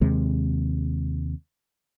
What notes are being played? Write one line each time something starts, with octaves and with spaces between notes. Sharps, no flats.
D#2 C3 G#3